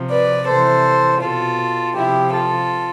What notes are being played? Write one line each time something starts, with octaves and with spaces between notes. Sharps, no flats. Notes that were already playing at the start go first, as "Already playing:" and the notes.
Already playing: C3 F3
B4 D5
C3 E3 A4 C5
B2 F4 A4
C3 F3 E4 G4
F4 A4